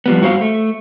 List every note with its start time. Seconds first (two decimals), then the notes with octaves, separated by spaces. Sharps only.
0.06 F3 G3 B3
0.21 G2 F#4 C5 F5
0.41 A3